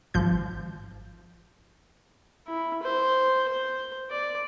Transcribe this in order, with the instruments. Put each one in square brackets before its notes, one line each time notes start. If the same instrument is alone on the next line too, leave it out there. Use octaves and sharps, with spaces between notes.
[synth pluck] G#1 F3 G6
[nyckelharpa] E4
C5
C5
D5